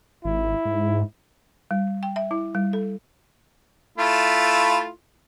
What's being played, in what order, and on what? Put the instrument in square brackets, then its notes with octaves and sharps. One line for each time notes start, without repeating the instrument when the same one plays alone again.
[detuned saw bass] G#1 [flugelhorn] E4
[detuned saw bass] G#2
[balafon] G3
G5
E5
E4
G3
A4
[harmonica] A3 E4 F4